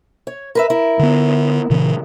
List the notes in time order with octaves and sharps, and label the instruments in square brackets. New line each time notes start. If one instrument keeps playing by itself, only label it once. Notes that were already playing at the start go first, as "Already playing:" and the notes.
[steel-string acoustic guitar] C#5
A#4 B4 E5
E4 A#4
[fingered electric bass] D3 B3
A#2 C#3 E3